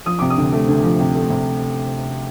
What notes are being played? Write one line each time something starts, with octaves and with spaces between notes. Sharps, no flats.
F3 D#6
C3 D6
D#6
D2
A3
D2
F3
C3
A3
C3